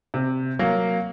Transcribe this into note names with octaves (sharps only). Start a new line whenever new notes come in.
C3
F#3 A#3